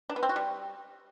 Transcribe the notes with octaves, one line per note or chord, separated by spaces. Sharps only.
D4
B3
C4
F#4
G3